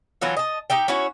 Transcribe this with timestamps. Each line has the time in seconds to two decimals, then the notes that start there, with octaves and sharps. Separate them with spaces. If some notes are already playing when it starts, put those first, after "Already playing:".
0.21 E3 F#3 F4 A4
0.37 D#5 A5
0.70 D#4 G4 E5 G5
0.88 C#4 E4 F#4 C#5